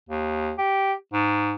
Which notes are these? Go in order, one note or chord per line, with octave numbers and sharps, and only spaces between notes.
D#2
G4
G#2